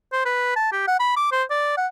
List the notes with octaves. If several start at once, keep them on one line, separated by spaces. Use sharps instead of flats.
C5
B4
A5
G4
F#5
B5
D6
C5
D5
F#5